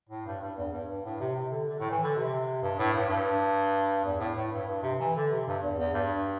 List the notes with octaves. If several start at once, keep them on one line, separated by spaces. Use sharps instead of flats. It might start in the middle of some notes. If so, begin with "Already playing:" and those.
A2
G2
G2
E2
G2
G2
A2
C3
C3
D3
D3
A2
E3
D3
C3
G2
A2
G2
G2
E2
A2
A2
G2
G2
C3
E3
D3
C3
G2
E2
E2
G2